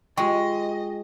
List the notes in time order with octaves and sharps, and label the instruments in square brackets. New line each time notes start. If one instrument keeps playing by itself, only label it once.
[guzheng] G#3 [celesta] F4 G5 [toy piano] G4 C#6 [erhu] D#5